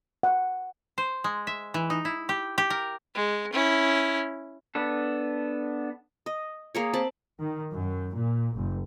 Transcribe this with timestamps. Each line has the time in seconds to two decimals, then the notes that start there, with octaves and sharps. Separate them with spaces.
0.23 F#5
0.98 C5
1.24 G#3
1.47 E5
1.74 E3
1.90 D#4
2.05 E4
2.29 G4
2.58 G4
2.70 A#4
3.15 G#3
3.53 C#4 E4
4.75 B3 D4 A4
6.26 D#5
6.75 A#3 G#4 C#5
6.94 C4 A5 B5
7.41 D#3
7.73 F#2
8.17 A#2
8.54 F#1